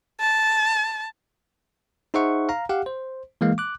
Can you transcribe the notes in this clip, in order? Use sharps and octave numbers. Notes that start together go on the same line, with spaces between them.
A5
D#4 G#4 C5 E5 F#5 C#6
F5 A#5
G4 F5 F#5
C5
E3 G#3 A#3 F5
D6 F#6